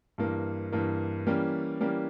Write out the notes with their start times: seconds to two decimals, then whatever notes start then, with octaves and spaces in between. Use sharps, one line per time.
0.18 G2 E3 A#3
0.72 G2 E3 A#3
1.26 E3 G3 A#3 C#4
1.81 E3 G3 A#3 C#4